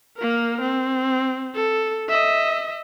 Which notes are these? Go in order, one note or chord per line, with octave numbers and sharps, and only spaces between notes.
A#3 A#4
C4
A4
D#5 E5